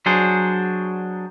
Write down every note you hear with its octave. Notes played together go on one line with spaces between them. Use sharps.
F#3 D4 G#4 C5